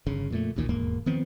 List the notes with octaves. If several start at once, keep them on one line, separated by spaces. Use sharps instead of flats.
G1 C#3
F2 A#2 A3
A1 D2 A#2 D#3
E1 D#2 G#2 A#3
D#3 F3 B3 C4